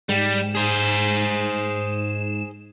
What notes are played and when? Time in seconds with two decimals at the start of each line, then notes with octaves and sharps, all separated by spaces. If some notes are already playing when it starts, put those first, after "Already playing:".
0.09 G#2 G3 E7
0.55 G#4 C5